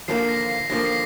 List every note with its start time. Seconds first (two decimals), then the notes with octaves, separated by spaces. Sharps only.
0.08 D#2 D3 F3 A#3 C7
0.23 C7
0.29 A#6
0.49 C7
0.70 D#2 D3 F3 A#3 A#6
0.85 C7